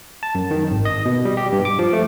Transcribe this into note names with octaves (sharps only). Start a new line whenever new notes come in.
A5
F#2
D#3
G#1
D#5
B2
G3
G4
G2
D6
F3
A3